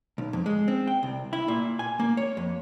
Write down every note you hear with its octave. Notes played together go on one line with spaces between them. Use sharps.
B1
F2
G#3
C4
G5
C2
E4
A#2
G#5
A#3
C#5
F2